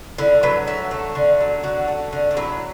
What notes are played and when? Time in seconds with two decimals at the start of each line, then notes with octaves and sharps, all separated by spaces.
0.18 D3 E4
0.43 F#3 B4
0.67 D3 E5
0.91 A3
1.15 D3
1.40 F#3
1.63 D3 F#4
1.88 A3
2.13 D3
2.31 D4
2.37 F#3 E4